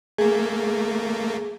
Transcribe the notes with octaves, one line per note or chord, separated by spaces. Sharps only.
A3 A#3 G#4